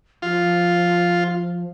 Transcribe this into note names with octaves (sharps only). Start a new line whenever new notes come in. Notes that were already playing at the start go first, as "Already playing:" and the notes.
F3 F4